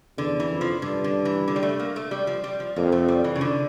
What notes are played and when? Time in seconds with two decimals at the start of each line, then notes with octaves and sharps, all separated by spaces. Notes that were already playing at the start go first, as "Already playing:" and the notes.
0.17 E2 D3
0.40 E3
0.51 F2
0.61 F3
0.82 G2 D3
1.04 D3
1.25 E3
1.48 D3
1.56 G3
1.63 A3
1.80 A#3
1.96 A3
2.11 G3
2.27 F3
2.44 G3
2.60 F3
2.76 F2 A#3
2.92 A3
3.08 G3
3.24 E3
3.36 C#3
3.41 D3